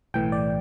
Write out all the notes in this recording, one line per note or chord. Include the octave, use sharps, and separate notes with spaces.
B1 A2 E3 G5
D5